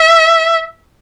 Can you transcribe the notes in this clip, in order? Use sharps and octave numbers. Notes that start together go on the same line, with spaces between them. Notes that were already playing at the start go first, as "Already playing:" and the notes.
Already playing: E5